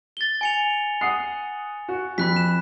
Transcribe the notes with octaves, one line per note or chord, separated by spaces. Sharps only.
A6 G7
G#5 C#7 F7
F#5 D#6 C7
F#4
F2 B5 F#6 B6
E7